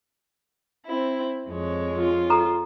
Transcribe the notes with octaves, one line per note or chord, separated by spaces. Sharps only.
C4 E4
F2 G#3 C#5
F4
A4 A#5